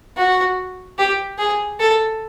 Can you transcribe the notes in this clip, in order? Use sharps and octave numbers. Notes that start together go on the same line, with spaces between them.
F#4
G4
G#4
A4